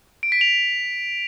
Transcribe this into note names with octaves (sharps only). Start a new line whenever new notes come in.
D7
B6
F7